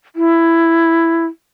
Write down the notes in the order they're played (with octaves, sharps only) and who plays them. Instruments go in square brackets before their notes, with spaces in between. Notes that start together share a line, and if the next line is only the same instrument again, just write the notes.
[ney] E4